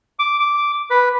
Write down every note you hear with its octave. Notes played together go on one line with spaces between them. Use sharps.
D6
D6
B4